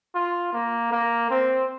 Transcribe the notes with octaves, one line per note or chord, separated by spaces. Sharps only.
F4
A#3
A#3
C4